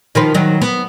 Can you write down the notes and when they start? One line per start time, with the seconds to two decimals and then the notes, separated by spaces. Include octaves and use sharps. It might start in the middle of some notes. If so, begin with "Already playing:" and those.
0.15 D#3 F3 B4
0.34 D#3 F#3
0.62 B3